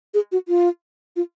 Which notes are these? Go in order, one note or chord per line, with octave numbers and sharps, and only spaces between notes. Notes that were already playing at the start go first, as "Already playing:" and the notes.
G#4
F#4
F4
F4